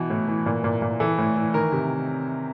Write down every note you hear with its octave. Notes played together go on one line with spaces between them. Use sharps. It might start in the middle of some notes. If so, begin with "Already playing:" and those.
Already playing: B2 E3
A2
E3
A#2
A#2
A#2
E3 A4
A2
E3
D#3 A#4
C3